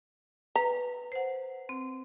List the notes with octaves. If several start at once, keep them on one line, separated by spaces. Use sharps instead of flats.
B4 A#5
C5 F#5
C4